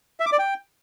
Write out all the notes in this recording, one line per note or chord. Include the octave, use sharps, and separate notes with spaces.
E5
D6
D5
G5